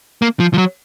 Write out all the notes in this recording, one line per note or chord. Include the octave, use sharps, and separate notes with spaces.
A#3
F3
F3
F#3